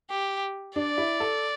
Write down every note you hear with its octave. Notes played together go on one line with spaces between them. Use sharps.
G4
D4 D5
E4
A4